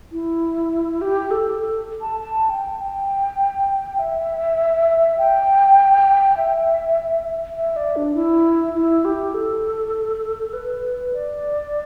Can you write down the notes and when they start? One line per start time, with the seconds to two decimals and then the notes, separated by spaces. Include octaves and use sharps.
0.12 E4
1.01 G4
1.31 A4
1.60 A4
2.01 A5
2.21 A5
2.50 G5
2.80 G5
3.99 E5
5.18 G5
6.37 E5
7.57 E5
7.76 D5
7.96 D4
8.15 E4
8.74 E4
9.05 G4
9.34 A4
10.53 B4
11.13 D5